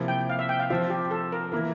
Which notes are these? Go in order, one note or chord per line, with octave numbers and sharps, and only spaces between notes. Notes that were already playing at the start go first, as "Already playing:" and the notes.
Already playing: C3 F3 A#3 E4
G5
F5
E5
G5
F5
F3 C4 F4 E5
G4
A4
A#4
E3 A#3 E4 A#4